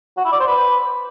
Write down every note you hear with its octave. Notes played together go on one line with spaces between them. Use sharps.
F#4
E4
D5
C5
B4